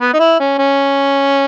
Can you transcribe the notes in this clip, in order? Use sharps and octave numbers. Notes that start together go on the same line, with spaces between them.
B3
D#4
E4
C#4
C#4